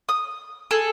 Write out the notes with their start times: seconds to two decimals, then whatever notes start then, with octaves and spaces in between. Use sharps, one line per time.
0.09 D#6
0.71 G#4 A4